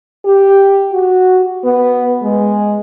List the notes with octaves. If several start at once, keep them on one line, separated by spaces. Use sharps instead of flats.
G4
F#4
B3
G#3